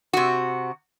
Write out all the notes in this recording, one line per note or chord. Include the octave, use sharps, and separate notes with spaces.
C3 F#4